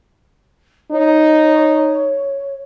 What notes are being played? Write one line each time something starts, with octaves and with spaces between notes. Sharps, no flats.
D#4 C#5